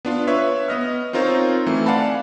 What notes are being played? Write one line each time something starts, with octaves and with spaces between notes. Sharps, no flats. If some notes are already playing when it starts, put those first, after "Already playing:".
B3 D4 F4
B4 C#5 E5
B3 D#5 F6
C4 D#4 F4 A#4 C5 C#5
E3 A3 C4
D5 F5 F#5 G#5 A5 B5